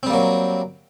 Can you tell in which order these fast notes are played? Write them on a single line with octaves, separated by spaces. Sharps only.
C4 G3 A#3 F#3